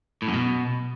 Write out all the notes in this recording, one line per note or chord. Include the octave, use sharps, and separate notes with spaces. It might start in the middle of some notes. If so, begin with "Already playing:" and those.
A2
F#2
B2